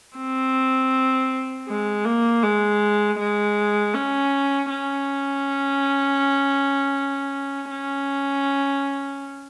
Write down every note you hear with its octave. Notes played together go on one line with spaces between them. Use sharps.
C4
G#3
A#3
G#3
G#3
C#4
C#4
C#4